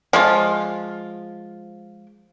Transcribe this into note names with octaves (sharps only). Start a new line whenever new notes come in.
F3 G#3 F4